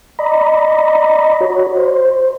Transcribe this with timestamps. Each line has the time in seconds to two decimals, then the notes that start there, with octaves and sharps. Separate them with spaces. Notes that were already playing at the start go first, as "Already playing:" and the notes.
0.19 D5 D#5 A#5 B5
1.40 F#4 C#5
1.77 C5